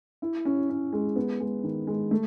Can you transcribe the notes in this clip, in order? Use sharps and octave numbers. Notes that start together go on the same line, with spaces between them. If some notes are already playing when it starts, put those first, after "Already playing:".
E4
C#4
C#4
G#3
B3
G#3
D#3
G#3
A3